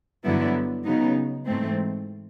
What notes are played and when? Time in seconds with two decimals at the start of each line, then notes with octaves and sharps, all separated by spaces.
0.24 G2 D3 F#3 B3 E4
0.85 C#3 F#3 B3 D#4
1.45 G#2 E3 A3 C4